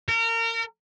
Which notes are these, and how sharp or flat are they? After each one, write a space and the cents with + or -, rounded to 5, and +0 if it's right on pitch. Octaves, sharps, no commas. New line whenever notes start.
A#4 -30